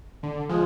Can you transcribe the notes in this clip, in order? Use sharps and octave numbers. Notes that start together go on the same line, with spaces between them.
D3
F3 G#3